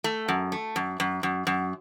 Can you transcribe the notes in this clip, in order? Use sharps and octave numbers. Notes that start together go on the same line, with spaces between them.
A3
F#2
A3
F#2
F#2
F#2
F#2